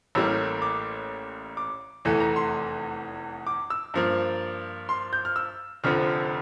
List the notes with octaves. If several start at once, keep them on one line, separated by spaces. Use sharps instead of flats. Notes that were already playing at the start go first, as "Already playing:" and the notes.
A1 A2 G3 A#3 E6
D6
D6
F1 E2 E3 A3
A#5
C6
D6
E6
G2 F3 A#3
C6
G6
F6
E6
F1 F2 D3 F3 F6